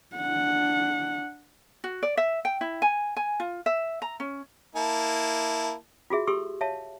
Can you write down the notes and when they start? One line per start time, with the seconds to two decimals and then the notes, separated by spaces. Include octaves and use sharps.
0.16 D4 F#5
1.84 F#4
2.03 D5
2.17 E5
2.45 G5
2.61 E4
2.82 G#5
3.17 G#5
3.40 F4
3.66 E5
4.02 A#5
4.20 C#4
4.76 A#3 E4 A5
6.10 F4 F#4 G#4 E5
6.27 G4 A4 C6 C#6 E6
6.61 C#5 E5 F5 A5